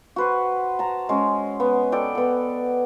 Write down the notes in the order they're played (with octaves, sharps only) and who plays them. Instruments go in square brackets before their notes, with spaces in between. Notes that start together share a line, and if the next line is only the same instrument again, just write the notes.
[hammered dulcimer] F#4 B4 C5
A5 A#5
G#3 C#4
B3
A4 D5 G5
B3 A4